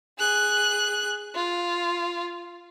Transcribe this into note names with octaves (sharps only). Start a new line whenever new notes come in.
G#4 F#6
F4